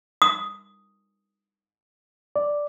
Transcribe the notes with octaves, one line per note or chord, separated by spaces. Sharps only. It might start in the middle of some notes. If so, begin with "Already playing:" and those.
D#6
D5